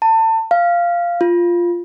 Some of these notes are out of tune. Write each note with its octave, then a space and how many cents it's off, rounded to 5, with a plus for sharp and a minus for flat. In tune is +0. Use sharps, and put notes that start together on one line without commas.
A5 +30
F5 -10
F4 -5